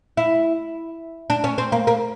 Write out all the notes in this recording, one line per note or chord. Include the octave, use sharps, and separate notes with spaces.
E4
D4
C#4
C4
A#3
A#3